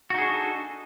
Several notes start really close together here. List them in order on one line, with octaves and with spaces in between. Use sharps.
F#4 D#4 G#4 D4 A4